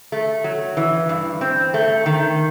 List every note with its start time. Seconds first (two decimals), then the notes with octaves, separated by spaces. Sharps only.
0.12 A3
0.44 F#3
0.77 E3
1.09 G2
1.41 C4
1.74 A3
2.06 D#3